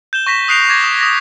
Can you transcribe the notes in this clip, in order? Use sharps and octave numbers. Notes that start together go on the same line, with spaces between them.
G6 E7 G7
C#6 A#6 B6 E7
D#6 F#6 C7 D7 F7 G7
D6 G#6 A#6
D#6
D#6 A#6 B6